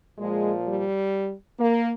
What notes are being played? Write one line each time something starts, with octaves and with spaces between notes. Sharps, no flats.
A#2 F3 G#3
G3
A#3